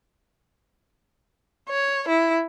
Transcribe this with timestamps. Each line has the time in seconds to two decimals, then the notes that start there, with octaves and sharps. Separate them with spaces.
1.69 C#5
2.08 E4